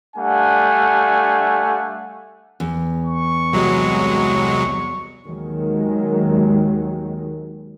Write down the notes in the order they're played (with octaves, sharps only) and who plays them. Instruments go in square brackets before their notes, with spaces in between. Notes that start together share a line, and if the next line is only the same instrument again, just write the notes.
[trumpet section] G3 A3 D4 F5 F#5 G#5
[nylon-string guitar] E2
[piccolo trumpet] C#6
[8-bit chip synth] C2 F#3 G#3
[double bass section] D#2 D#3 F#3 G#3